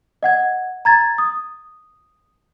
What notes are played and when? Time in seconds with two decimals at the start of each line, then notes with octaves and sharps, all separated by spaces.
0.23 D#5 F#5 G#6
0.85 A#5 G#6 A6
1.18 D#6